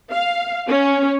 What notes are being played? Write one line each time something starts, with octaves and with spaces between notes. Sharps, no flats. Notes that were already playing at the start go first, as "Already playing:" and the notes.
F5
C#4